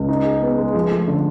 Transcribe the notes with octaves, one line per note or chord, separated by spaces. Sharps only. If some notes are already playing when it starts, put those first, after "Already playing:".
Already playing: C#2
D#4
G#4
B3
G#3
F3
A3
D3